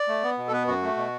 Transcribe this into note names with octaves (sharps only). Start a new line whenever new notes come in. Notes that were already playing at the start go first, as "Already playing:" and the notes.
Already playing: D5
A3
B3
B2
A4
B3 B4
F#2 F#4
A3
B2